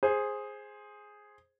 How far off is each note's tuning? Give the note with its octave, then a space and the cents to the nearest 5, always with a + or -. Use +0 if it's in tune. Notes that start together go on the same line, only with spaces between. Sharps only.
G#4 +0 C5 +10